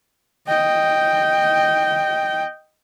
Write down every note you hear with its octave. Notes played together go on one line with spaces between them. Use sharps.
D#5 G5